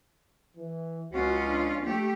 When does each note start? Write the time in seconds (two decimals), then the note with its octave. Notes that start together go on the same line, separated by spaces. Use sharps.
0.57 E3
1.13 C#2 C#4 F4 F#4
1.47 D4
1.84 A3 G4